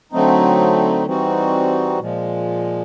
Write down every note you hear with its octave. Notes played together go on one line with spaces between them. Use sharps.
D3 F#3 A3 C4 D#4
E3 G3 C4 D#4 F#4
A#2 F3 G#3